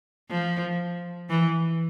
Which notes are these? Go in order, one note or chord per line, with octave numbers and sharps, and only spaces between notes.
F3
E3